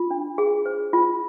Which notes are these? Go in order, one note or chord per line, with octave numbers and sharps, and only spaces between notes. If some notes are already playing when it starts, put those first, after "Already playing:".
Already playing: F4
D4
G#4
C5
F4